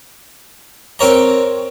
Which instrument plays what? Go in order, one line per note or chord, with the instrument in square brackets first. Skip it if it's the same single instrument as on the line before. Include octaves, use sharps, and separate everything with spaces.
[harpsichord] C4 A#4 C#5 A#5